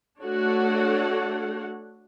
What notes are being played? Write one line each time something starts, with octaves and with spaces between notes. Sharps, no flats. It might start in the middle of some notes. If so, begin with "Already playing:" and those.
A3 D4 F#4 A4 C#5 F#5